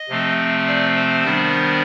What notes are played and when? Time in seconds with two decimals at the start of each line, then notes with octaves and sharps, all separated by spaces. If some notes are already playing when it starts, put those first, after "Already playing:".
Already playing: D#5
0.09 C3 F3 A3 C4
0.67 D5
0.96 C5
1.24 D#3 G3 B3 D4